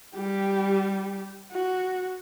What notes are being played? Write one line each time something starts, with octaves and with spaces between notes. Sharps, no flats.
G3 G4
F#4